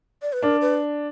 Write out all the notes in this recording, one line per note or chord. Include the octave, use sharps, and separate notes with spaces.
D5
B4
D4 A#4
B4